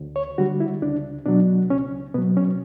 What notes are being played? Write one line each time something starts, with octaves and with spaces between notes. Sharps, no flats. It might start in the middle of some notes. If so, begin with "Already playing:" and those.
Already playing: D2
C#5
D3 G3 F#4
E4
C#2 D4
B2 F#3 D4
C#2 C#4
B2 F#3 B3
C#4